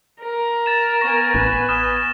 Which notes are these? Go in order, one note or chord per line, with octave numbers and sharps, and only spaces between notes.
A#4
A6 E7
B3 G#5 C#6 A#6
A1 B4
D#6 F6 E7